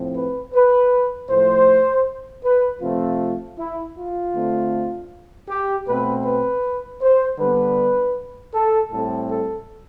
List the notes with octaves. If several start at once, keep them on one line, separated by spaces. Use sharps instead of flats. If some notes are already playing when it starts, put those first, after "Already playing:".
Already playing: A2 F3 C4
B4
B4
A2 F3 A3 C5
B4
C3 F3 A3 C4 F4
E4
F4
D3 A3 C4
G4
B2 A3 C4 B4
B4
C5
D3 G3 B3 B4
A4
A2 G3 C4 A4
A4